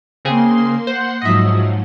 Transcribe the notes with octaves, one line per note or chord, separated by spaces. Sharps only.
C#3 A#3 C4 G#4 C6
C5 F#5 C6
G#2 F3 F#3 D#5 E5